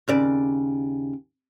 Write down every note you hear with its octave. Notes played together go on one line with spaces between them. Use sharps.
D#2 C#3 D5